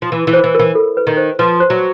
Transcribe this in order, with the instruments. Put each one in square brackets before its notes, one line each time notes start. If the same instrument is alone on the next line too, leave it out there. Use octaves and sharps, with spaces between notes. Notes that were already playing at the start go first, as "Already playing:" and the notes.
[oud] F3
E3
E3
[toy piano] C5
[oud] E3
[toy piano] A#4
[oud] E3
[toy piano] A4
B4
[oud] D#3
[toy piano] C5
[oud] F3 [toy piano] B4
[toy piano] C5
[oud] F#3